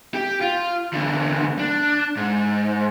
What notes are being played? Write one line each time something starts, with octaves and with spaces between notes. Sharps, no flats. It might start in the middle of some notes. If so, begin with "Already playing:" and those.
G4
F4
E2 D3
D4
G#2